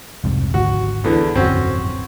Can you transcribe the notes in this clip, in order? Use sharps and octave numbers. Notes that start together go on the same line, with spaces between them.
C2 F2 G#2
G#1 D2 F#4
E2 D3 E3
D1 G1 F2 C4 C#4 F#4